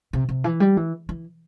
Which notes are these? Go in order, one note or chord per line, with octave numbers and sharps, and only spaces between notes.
C3
C3
E3
G3
E3
E3